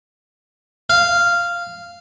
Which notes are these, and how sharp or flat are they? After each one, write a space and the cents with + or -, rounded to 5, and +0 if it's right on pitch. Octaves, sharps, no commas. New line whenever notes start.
F5 -10